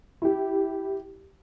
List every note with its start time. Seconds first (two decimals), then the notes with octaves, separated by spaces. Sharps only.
0.22 E4 G4